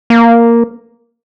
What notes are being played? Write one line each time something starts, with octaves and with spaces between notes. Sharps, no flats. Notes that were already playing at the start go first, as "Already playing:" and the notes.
A#3